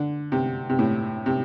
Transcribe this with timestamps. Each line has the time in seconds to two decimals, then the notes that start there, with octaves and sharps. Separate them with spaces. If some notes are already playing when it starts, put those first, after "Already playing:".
Already playing: D3
0.32 C3
0.69 C3
0.79 A2
1.26 C3